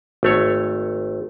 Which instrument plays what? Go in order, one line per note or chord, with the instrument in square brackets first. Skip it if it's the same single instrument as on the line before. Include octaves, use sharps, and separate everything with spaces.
[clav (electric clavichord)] G#1 A3 C#5